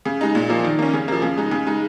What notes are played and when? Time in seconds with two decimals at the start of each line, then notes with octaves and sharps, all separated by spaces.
0.05 C#3
0.21 G#3 D#4
0.35 A#2
0.50 F3 A#3
0.65 D#3
0.79 A#3 C#4
0.93 C#3
1.08 F3 A#3
1.22 C#3
1.37 G#3 D#4
1.51 C#3
1.66 G#3 D#4